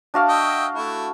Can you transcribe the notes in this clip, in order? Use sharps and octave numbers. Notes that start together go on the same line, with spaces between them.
D4 F#4 F5
D#5 E5 G5
A3 E4